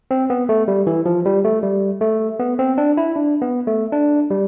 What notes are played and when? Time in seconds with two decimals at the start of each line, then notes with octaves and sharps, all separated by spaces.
0.11 C4
0.30 B3
0.49 A3
0.68 G3
0.87 E3
1.06 F3
1.25 G3
1.45 A3
1.63 G3
2.01 A3
2.39 B3
2.59 C4
2.78 D4
2.97 E4
3.16 D4
3.42 B3
3.67 A3
3.92 D4
4.30 G3